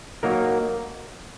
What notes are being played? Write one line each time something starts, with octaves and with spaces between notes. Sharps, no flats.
F#3 A#3 D#4 A#4